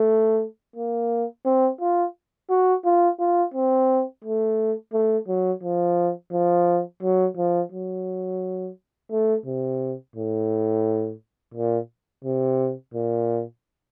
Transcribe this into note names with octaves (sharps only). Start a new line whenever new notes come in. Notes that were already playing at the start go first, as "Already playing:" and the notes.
Already playing: A3
A#3
C4
F4
F#4
F4
F4
C4
A3
A3
F#3
F3
F3
F#3
F3
F#3
A3
C3
A2
A#2
C3
A#2